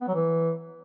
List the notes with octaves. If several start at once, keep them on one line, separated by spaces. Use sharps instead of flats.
B3
F#3
E3